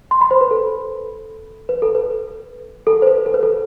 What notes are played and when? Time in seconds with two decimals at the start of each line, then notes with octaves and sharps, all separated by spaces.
0.11 C6
0.21 B5
0.31 C5
0.41 B4
0.51 A4
1.69 B4
1.82 A4
1.95 B4
2.87 A4
3.02 C5
3.07 B4
3.26 A4
3.34 B4
3.43 A4